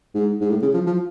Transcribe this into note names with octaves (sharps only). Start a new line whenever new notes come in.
G#2
G#2
A2
C#3
F3
F3